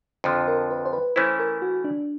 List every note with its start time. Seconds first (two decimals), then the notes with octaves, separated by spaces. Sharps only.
0.24 F2 D3 F3
0.48 A#4
0.71 B4
0.85 C5
0.93 B4
1.16 E3 A3 C#4 E4 C5
1.39 A#4
1.62 F#4
1.84 D4